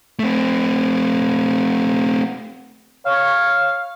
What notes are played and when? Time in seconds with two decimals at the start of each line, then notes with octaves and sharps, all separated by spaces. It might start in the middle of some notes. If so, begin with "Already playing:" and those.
0.19 A3 C4
3.06 C#5 F5